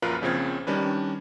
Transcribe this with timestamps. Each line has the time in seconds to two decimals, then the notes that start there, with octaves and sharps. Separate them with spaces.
0.02 A#1 F#2 F4 A#4 B4 F#6
0.22 A#1 C#3 F3 C4 G#6
0.67 D#3 G3 C#4 D4 B4